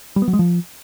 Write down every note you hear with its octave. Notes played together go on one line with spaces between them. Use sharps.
G3
B3
F#3
G#3
F3